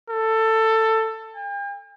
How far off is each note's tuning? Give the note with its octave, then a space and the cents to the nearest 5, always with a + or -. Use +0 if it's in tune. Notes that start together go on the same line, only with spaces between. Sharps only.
A4 +15
G5 +45